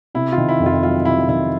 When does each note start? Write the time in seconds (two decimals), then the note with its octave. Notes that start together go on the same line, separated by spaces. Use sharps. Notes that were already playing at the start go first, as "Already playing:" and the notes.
0.15 C3 E4
0.32 F4
0.38 D#3
0.49 E4
0.60 F2
0.66 F4
0.83 F#3 F4
1.05 C3 E4
1.29 D#3 E4